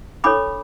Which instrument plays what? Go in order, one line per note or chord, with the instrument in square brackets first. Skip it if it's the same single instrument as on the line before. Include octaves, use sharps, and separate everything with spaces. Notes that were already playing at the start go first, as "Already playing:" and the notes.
[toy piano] D4 A4 C#5 B5 D6